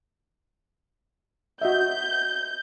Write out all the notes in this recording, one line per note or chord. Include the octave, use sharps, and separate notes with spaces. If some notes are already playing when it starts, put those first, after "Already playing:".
F#4 D#5 E5 G6